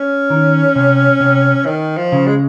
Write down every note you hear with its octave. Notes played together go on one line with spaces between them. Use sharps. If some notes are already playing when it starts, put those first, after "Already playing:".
Already playing: C#4
D#3
C3
C3
D#3
F3
C#3
G#3